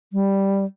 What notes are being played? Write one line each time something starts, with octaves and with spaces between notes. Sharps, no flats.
G3